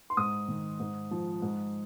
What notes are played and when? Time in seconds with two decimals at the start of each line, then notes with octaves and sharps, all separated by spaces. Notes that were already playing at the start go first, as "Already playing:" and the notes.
0.10 C6
0.17 G#2 D#6
0.48 D#3
0.80 G#2
1.11 F3
1.42 G#2